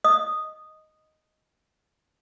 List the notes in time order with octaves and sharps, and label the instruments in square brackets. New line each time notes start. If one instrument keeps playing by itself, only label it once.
[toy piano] D#5 D#6